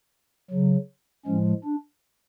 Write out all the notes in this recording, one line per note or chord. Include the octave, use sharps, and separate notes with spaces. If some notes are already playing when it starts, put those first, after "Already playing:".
C#3 F#3
A2 F3 G#3 C#4
D4